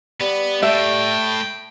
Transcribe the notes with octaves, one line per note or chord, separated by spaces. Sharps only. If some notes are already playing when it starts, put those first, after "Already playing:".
G3 B3
A2 E5 G5